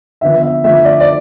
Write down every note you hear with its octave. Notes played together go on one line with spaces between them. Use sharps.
D3 F3 B3 E5
E5
D3 F3 A3 E5
D5
D5